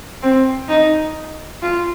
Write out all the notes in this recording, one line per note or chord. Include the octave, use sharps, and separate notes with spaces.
C4
D#4
F4